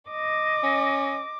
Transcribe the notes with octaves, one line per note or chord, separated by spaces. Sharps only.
D#5 D6
C#4